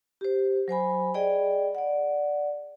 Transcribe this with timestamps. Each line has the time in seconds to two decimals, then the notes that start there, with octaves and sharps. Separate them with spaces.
0.21 G4 C5
0.68 F#3 C5 G#5 B5
1.14 G#4 D5 D#5 G5
1.75 D5 F#5